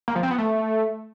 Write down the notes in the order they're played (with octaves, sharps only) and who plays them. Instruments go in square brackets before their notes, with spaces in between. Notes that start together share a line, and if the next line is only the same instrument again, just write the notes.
[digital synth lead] A#3
F3
C4
B3
A3